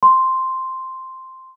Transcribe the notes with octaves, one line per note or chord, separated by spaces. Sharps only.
C6